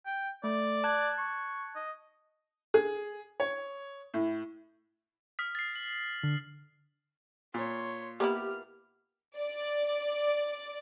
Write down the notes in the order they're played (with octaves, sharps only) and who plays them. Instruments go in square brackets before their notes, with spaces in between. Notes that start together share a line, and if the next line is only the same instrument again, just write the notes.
[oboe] G5
[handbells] A3 [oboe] D5
[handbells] A5 F#6 G#6
[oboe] C#6
D#5
[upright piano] G#4
C#5
A2
[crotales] D#6 F6 B6
A6 C7
F#7
[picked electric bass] D3
[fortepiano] A#2 [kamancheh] C#5 C6
[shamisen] A#3 B3 E4 [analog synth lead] G4 [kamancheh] F6
[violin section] D5